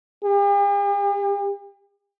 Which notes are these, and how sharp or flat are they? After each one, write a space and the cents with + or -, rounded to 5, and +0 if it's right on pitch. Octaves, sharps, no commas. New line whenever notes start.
G4 +45